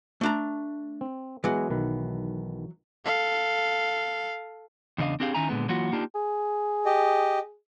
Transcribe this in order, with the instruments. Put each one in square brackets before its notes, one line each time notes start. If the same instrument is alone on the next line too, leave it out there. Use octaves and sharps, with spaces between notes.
[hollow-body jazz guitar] A3 D4 A#5
[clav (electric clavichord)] C4
[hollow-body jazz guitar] E3 F#3 [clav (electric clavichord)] G#3 B3 G#4
[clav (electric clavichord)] B1 D#3 B4
[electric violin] A4 F5
[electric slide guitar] E2 C#3 D4 D#5 F5
C4 D4 G4 G#4 F5
D#3 C#4 D#4 E4 G#5 A#5
A#2 D3 G#3 B3
E3 F#3 A#3 F4 F#4
A#3 D4 D#4 F4 G4
[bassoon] G#4
[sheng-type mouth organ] G4 D#5